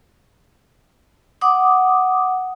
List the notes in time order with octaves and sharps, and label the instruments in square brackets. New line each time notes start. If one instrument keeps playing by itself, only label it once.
[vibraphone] F#5 D6 D#6